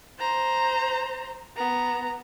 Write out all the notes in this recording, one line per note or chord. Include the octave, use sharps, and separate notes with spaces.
C5 A#5
B3 A#5